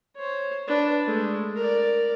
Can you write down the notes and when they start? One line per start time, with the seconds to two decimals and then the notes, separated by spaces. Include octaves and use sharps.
0.16 C5 C#5
0.67 D4 B4
1.06 G#3 A3
1.56 A#4 D5